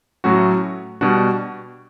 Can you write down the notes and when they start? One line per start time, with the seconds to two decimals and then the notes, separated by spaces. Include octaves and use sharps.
0.24 A2 F#3 A3 C#4 F#4
1.01 B2 G3 D4 F#4